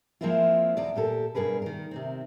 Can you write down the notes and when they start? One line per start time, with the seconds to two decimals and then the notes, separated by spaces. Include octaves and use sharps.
0.21 F3 G#3 A#3 C4 E4 F4
0.77 E2 B2 D5
0.96 A#2 G4 A4 A#4
1.35 G2 B2 G#4 A#4 B4
1.62 D#3 A#4
1.91 C3 D#3 C4